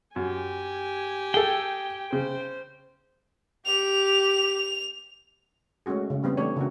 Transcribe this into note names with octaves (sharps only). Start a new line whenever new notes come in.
F#2 G4 G#5
G#4 A4 G5
C#3 C5
G4 F7
G#3 A3 C#4 F#4 G#4
C#3
E3 G3 B3 C4
E3 A3 D4 G4 C#5
C#3 A#3 F#4